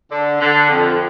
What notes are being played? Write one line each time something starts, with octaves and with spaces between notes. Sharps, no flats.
D3
D3
F2